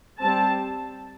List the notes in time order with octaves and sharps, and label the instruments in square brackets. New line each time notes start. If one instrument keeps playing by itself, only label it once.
[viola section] G3 C4 A5